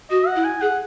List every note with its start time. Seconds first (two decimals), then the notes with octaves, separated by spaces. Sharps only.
0.10 F#4 D#5
0.27 F#5
0.36 E4
0.44 G#5
0.61 G#4 F#5